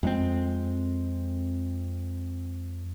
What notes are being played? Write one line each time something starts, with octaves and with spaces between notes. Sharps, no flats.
F2 G#3 C4